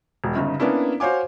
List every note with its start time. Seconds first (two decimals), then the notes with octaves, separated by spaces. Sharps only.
0.24 E1
0.36 G1 C#3 D#4
0.60 A#3 B3 C#4 D4 E4
1.00 F#4 C5 C#5 F5 G#5 D6